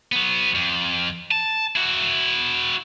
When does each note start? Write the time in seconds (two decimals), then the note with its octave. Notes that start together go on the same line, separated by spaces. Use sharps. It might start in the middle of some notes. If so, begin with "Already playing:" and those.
0.12 F#3 B3
0.55 F2
1.31 A5
1.76 E4 F#4